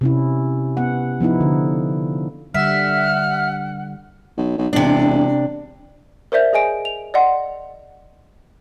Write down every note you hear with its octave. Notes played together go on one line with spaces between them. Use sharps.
C3 C#4 E4
B3 F#5
F3 B3 D#4 E4
D3
D3 G3 E5 F#5 F6
B1
B1
E1 C3 D4
A#4 C5 D5 E5 G6
G#4 D#5 G#5 D7
F7
D5 D#5 F#5 C6